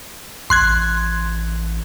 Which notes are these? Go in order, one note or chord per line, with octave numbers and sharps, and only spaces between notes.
A1 C6 F#6 G#6